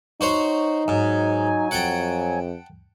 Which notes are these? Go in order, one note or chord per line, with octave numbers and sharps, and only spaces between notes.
D#4 F#4 C5 C#5
G#2 F#3 G#5
F2 F#5 G5 A5